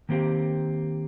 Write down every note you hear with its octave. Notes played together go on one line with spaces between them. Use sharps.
D#3 A#3 C4 G4